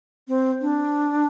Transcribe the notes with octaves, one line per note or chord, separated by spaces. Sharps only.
C4
D4